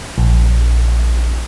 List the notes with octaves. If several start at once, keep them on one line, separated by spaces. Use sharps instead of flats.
A#1